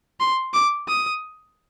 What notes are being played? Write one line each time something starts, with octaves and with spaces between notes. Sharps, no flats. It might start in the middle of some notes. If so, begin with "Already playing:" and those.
C6
D6
D#6